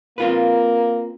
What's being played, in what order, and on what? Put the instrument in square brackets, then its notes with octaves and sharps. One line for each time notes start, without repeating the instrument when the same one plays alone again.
[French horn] A#3 [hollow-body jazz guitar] C4 F4 B4